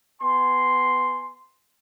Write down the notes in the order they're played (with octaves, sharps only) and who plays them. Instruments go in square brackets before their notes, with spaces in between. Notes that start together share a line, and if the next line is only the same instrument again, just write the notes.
[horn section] B3 G#5 C6